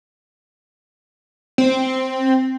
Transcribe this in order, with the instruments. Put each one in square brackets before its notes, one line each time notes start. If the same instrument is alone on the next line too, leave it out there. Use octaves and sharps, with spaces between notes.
[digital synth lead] C4